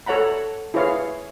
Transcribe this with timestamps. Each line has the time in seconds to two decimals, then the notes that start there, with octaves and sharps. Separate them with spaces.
0.06 A4 C#5 F#5 A#5 B5
0.74 E4 G#4 B4 C#5 F5